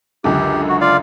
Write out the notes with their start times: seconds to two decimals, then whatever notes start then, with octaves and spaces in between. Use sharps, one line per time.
0.24 C#2 F#2 D3 G4
0.69 F#4
0.81 F4 D5 F5